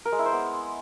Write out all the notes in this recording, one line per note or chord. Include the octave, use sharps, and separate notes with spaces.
A#4
G#3
E4
C5
B3